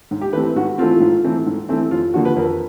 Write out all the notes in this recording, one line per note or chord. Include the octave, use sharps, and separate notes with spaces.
G#2
G4
E3 A3 C4 B4
G#2 F#4
E3 A3 C4 F4
G#2
E3 A3 C4
G#2
E3 A3 C4
F2 F4
D3 F3 A#3 F#4
B4
F2 A#4